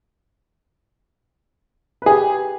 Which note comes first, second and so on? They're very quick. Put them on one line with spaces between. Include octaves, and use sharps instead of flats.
B4 G#4 G4